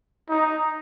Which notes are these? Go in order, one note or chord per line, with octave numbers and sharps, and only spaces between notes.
D#4